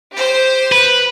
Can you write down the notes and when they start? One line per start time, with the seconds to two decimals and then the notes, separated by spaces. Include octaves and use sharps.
0.12 G4 C5
0.72 B4